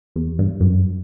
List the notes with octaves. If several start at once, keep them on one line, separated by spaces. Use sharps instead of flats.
E2
G2
F#2